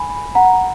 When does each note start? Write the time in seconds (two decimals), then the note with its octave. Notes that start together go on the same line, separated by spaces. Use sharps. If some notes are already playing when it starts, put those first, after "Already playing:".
Already playing: G#5 B5
0.35 F#5 A#5